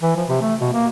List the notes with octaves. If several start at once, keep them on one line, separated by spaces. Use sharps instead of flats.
E3
F3
C3
A3
B2
A#3